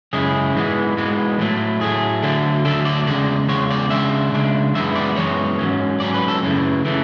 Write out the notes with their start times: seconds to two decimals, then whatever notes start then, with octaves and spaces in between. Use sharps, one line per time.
0.13 F#2 C#3 G#3 C#4 E4 G#4
0.55 G#2 E3 G#3 B3
0.97 G#2 E3 G#3 B3
1.39 A2 F#3 A3
1.81 A2 F#3 A3 G#4
2.22 D2 D3 F#3 A3 D4
2.65 D2 D3 F#3 A3 D4 A4
2.85 D5
3.06 E2 C#3 G#3 D5
3.48 E2 C#3 G#3 C#5
3.70 D5
3.90 C#3 G#3 D4 E5
4.32 C#3 G#3 D4
4.75 F#2 E3 G#3 B3 E5
4.96 D5
5.16 F#2 E3 G#3 B3 C#5
5.58 G#2 F#3 C#4
6.00 G#2 F#3 C#4 D5
6.14 B4
6.28 A4
6.43 F#2 C#3 E3 A3
6.85 C#3 E3 A3